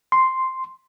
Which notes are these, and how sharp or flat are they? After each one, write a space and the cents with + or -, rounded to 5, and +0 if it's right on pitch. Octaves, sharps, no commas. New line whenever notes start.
C6 +0